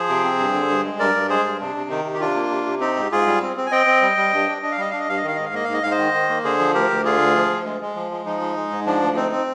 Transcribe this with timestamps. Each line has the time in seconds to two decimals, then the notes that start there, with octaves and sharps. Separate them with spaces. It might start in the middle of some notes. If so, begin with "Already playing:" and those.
Already playing: F3 G#4 C5
0.09 C3
0.24 C4
0.39 G2
0.54 D3
0.69 G2
0.85 G#3
0.99 G2 A#4 D5
1.15 G2
1.29 G#3 G#4 C5
1.45 G2
1.61 C3 D4
1.76 C3
1.90 D#3 D#4
2.05 C3
2.14 G4
2.20 C3 D4 F4
2.36 A#3
2.50 C3
2.66 C3
2.80 C4 D#4 G4
2.96 G#2
3.12 G#2 F4 G#4
3.27 G3
3.42 C4
3.57 C4
3.67 G#5
3.71 C4 D#5 G5
3.86 C4
4.02 G3
4.17 G3
4.33 G2
4.48 D4
4.62 D4 D#5
4.72 F5
4.78 G3 D#5
4.90 D4 F5
4.99 D#5
5.08 G2 F5
5.17 D#5
5.23 D#3 F5
5.36 G#2 D#5
5.45 F5
5.54 A#3 D#5
5.64 F5
5.69 G#2 D#5
5.83 G#2 F5
5.91 C5 D#5
5.98 D#3
6.14 D#3
6.29 A#3
6.44 D3 G#4 C5
6.59 F3
6.74 D2 G4 A#4
6.90 D2
7.05 D3 F4 G#4
7.21 D2
7.35 F3
7.50 D2
7.65 G#3
7.81 G#3
7.96 F3
8.11 G#3
8.26 F3 D#4
8.41 G#3
8.56 G#3
8.71 G#2
8.86 F3 D4
9.02 D2
9.17 C4 D#4
9.32 C4